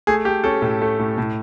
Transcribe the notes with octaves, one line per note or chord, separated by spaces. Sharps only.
A3 G#4
A3 G4
C#4 A4
A2
A3
A2
A2